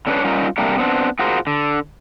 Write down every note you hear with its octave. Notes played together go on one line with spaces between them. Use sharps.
D3 C#4 D4 G4 B4 C#5
G3 C#4 D#4 F4 A#4
C3 G3 A3 A#3 D4 A#4
B3 C4 D4
F4 F#4 G#4 A#4 C5
D3